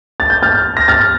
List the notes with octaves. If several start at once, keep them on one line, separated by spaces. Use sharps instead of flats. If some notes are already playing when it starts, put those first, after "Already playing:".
A6
G6
F6 A6
A#6
F6 A6